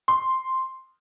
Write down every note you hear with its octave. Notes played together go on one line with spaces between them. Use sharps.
C6